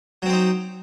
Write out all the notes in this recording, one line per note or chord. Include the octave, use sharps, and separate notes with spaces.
F#3 C4 D#4 C5